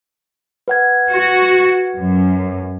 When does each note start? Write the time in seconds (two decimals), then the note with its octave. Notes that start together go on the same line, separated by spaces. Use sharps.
0.68 B4 F#5 G#6
1.11 F#4
1.97 F#2